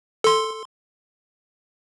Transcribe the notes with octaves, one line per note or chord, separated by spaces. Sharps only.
A4 C6